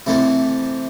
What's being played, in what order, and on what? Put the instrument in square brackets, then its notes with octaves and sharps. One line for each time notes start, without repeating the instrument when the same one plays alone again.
[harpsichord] C3 E3 A3 C4 E4